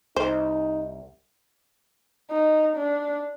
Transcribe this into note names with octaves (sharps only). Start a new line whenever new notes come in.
C2 D#4 C5
D#4
D4